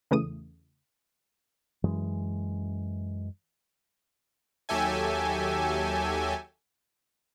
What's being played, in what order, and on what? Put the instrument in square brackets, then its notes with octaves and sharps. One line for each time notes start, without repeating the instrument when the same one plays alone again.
[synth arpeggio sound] E2 C#3 E3 A3 D#6 D#7
[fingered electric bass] F#2 E3 G#3
[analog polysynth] D#2 F#3 G4 A4 E5 G#5